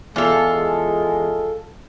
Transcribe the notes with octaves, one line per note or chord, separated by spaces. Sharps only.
E2 G#3 F4 A4